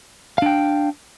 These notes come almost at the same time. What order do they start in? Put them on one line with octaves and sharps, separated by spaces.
F5 D4 G5